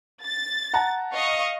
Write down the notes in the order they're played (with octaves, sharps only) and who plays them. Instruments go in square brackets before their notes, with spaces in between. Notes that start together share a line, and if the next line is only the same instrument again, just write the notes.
[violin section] A6
[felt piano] F#5 A5 A#5
[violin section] D#5 F5 C#6